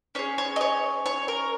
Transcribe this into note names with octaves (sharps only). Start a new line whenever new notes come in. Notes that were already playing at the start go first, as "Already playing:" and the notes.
C#4 G#4 C#5
C#5
D#5
C#5
C#5
A#4